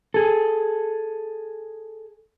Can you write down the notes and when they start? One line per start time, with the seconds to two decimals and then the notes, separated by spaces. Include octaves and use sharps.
0.14 G#4 A4